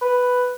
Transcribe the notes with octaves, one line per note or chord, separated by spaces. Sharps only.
B4